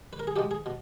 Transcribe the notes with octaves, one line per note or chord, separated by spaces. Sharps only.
B4
A#4
G#4
E2 B2 G#3 G4
G#4
B2